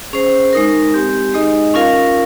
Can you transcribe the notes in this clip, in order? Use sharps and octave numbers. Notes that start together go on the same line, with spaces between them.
C#4 G#4 C5
G#3 D#4 A#4
G#3 C4 G4
G#3 D#4 G#4 D#5
C#4 F4 A#4 F5